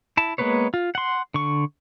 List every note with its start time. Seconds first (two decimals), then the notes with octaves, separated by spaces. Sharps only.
0.17 E4 A5
0.38 G#3 A#3 B3 B4 C#5
0.74 F4
0.95 F#5 C6
1.34 D3 C#6